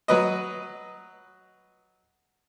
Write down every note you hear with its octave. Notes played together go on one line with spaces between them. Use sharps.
F#3 B4 D#5